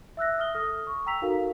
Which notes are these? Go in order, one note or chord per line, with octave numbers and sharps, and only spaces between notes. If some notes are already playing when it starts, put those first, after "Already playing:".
E5 E6 F#6 A#6
E5 D#6 F6 A#6 G7
A4 D#6 F6
C#6
G5 A#5 E6 B6 F7
D#4 F#4 A4 A#4 F5